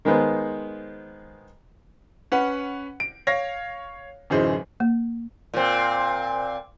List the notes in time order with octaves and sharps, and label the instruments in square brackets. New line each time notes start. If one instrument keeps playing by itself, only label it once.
[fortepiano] D#3 G#3 B3 C5
[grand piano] C#4 B4 F#5
D7
C#5 F5 A#6
D1 F#2 E3 D#4 G#4 C5
[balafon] A#3
[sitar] A#2 C4